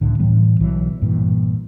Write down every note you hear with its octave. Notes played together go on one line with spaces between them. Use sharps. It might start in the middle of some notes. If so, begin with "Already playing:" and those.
C#2 A2 D3
A2 E3 G3 B3
B1 E3 F#3
G2 A#2 E3